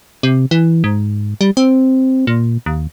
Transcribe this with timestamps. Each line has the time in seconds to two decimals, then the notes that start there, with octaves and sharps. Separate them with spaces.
0.23 C3
0.51 E3
0.84 G#2
1.41 G3
1.57 C4
2.27 A#2
2.66 D#2